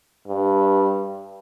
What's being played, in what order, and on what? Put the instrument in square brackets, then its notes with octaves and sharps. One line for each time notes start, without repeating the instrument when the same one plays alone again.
[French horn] G2